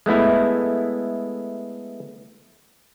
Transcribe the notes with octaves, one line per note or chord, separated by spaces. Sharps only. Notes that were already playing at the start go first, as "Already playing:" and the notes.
G#3 A3 B3 E4